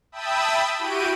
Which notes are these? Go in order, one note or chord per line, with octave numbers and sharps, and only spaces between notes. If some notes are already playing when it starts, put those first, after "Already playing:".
E5 G5 A5 B5 D#6 E6
E4 F#4 G4 G6 D7 D#7